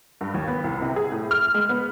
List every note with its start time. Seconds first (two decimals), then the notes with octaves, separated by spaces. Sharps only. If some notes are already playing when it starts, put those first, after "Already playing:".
0.21 G2
0.34 D#2
0.48 B3
0.64 C2
0.82 C3
0.96 G#4
1.12 A2
1.31 F6
1.54 G#3
1.69 B3